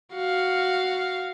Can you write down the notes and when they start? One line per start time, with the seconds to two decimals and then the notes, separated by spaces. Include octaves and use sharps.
0.14 F#4 F5